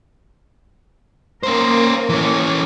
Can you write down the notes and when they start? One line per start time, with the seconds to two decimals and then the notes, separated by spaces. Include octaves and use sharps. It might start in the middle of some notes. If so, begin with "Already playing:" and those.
1.43 A#3 C#4 A#4 C5
2.09 E3 C#4